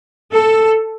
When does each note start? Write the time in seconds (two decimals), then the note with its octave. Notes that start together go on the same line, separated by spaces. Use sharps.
0.33 A4